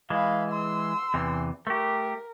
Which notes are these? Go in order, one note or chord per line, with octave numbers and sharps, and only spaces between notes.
E3 G#3 F5 B5
C6 E6
E2 C3 E3
A3 G4 A#4